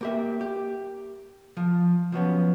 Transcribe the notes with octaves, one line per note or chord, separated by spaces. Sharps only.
A#3 G4 E5
G4
F3
F3 F#3 B3 C#4